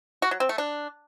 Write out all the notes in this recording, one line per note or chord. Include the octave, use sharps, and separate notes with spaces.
F#4
F#3
C4
A3
D4